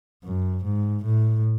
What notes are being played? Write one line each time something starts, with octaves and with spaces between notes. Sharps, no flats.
F#2
G#2
A2